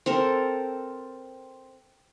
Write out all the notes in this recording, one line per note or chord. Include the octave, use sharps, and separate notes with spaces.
C4 A4 A#4